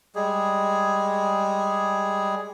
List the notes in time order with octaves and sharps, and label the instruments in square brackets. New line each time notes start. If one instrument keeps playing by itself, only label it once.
[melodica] G3 G#3 G#4